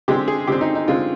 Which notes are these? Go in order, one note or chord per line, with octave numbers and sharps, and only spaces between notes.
D3 G#3 C4 G4
G#4
D3 G#3 C4 G4
D#4
D#4
D3 G#3 C4 F4